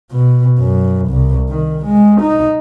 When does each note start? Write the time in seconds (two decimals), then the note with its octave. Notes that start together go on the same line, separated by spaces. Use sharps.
0.12 B2
0.58 F#2
1.09 C2
1.50 D#3
1.86 G#3
2.21 D#4